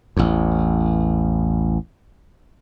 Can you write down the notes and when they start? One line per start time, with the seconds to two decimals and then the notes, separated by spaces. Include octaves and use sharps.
0.17 A1 E2